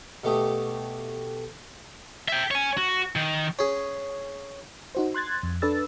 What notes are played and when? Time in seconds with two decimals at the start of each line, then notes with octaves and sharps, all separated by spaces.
0.24 B2 A3 G4 D#6
2.28 E5 G5
2.51 C#5 G#5
2.77 F#4
3.16 D#3
3.59 C#4 G#4
4.95 D#4 F#4 C5
5.14 C6 F#6 G#6 A6
5.43 F2
5.62 D4 A4 B4 D5 E6 A6